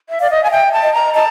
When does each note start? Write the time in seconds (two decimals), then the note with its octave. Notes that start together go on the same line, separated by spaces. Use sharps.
0.09 E5
0.20 D5 F5
0.30 D#5
0.43 G#5
0.46 F5
0.51 E5 G5
0.72 A5
0.82 D#5
0.93 A#5
1.14 D#5 A5